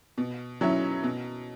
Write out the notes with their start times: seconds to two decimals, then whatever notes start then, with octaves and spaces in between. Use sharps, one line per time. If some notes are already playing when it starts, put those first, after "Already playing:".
0.18 B2
0.61 F#3 C#4 E4
1.03 B2